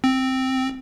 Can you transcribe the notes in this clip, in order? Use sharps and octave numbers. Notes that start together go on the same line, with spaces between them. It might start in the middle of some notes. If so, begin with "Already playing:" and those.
C4